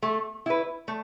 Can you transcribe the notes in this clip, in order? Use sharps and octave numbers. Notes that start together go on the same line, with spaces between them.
A3
E4 B4
A3